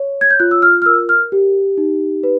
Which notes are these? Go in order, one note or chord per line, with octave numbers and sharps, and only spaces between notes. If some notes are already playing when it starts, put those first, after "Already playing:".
Already playing: C#5
G#6
G6
F4 F#6
E6
F6
F6
A#4 E6
F6
G4
D#4
B4